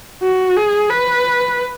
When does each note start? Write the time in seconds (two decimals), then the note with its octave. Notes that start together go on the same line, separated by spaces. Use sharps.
0.23 F#4
0.57 G#4
0.90 B4